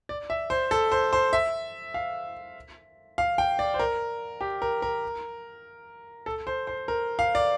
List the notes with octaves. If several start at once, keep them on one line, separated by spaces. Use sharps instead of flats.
D5
E5
C5
A4
C5
C5
E5
F5
F5
G5
D5
C5
A#4
G4
A#4
A#4
A4
C5
C5
A#4
F5
D5